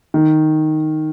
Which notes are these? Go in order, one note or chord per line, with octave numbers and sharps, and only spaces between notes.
D#3